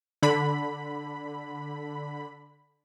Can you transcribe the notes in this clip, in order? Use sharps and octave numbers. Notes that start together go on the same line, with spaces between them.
D3 B5